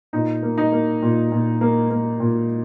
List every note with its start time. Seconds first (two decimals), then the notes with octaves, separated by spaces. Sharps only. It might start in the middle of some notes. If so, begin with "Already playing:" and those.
0.13 A#2 D#4
0.43 A#3
0.58 D#4
0.72 A#3
1.02 A#2
1.32 A#2
1.61 A#3
1.90 A#3
2.20 A#2